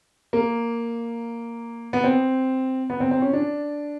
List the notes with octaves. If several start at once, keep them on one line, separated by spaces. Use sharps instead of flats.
A#3
B3
C4
B3
C4
C4
C#4
D4